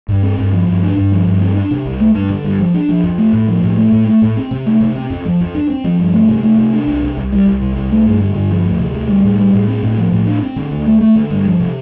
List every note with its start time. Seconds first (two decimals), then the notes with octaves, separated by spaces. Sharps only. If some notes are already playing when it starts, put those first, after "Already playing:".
0.08 G2
0.23 C4
0.38 G2
0.53 F3
0.67 G2
0.82 D4
0.96 G2
1.12 F3
1.27 G2
1.41 C4
1.56 D4
1.71 C3
1.85 C2
2.00 A3
2.14 G2
2.30 D3
2.44 G2
2.59 F3
2.74 D4
2.89 F3
3.04 F2
3.18 A3
3.33 A2
3.48 F3
3.63 A2
3.78 A3
3.92 A2
4.07 A3
4.22 A2
4.37 C4
4.51 C3
4.66 A3
4.81 C3
4.95 C4
5.10 F2
5.25 F3
5.40 F2
5.55 D4
5.70 C4
5.84 F3
5.99 G2
6.14 A3
6.28 C3
6.43 A3
6.58 C3
6.73 D4
6.87 C2
7.02 C3
7.17 C2
7.32 G3
7.46 C2
7.61 C3
7.76 C2
7.91 A3
8.06 G2
8.20 D3
8.35 G2
8.50 F3
8.65 D2
8.79 C3
8.94 D2
9.09 G3
9.23 A2
9.38 G3
9.53 A2
9.68 C4
9.83 A2
9.98 F3
10.12 A2
10.27 D4
10.42 C4
10.56 D3
10.71 D2
10.86 A3
11.01 A3
11.15 D3
11.30 G2
11.45 F3
11.60 C3